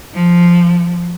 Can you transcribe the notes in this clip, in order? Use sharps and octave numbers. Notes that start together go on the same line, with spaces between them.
F3